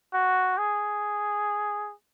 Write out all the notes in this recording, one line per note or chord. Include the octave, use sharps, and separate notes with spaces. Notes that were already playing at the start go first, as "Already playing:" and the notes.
F#4
G#4